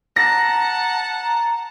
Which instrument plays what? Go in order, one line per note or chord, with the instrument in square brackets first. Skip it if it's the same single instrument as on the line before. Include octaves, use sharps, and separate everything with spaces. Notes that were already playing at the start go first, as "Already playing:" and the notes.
[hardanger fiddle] F#5 A5 [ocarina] A#5 [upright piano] A#6
[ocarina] A#5